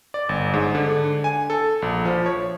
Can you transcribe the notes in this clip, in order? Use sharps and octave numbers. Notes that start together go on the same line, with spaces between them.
D5
G1
G#2
D3
G#5
A4
A#1
F3
C#5